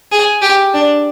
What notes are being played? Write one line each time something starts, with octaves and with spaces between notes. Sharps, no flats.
G#4
G4
D4